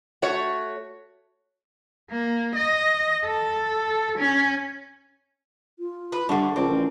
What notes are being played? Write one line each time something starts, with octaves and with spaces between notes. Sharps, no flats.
A3 F#4 C#5
A#3
D#5
A4
C#4
F4
B4
G2 D3 G3 E5 F#5 A5 C#6
C#2 F3 A#3 C4 D5 D6
A1 C#4